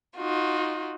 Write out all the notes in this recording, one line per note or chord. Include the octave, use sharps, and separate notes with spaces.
D#4 F4 F#4